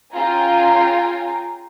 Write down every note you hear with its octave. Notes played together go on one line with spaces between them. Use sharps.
C#4 F4 G#4 G5 G#5 A#5